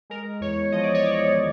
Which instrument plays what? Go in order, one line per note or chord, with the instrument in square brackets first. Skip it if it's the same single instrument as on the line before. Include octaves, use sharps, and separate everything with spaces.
[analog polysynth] G#3 A#4
E2 C#5
F3 D#5
D5
C#5
E2 D5
D#3